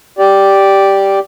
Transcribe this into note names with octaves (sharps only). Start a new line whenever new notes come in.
G4 D5